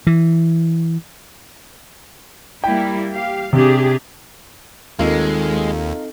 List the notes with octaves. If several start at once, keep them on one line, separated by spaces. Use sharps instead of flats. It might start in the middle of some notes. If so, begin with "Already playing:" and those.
E3
G3 A#3 E4 G5
G4 F5
C3 D4 G4 G#4
D#2 G#3 C4 D#4 F4 A4 A#4 D#5